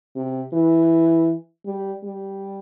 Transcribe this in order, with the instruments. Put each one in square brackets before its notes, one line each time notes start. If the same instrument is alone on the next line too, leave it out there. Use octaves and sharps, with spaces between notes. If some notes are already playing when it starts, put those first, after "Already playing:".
[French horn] C3
E3
G3
G3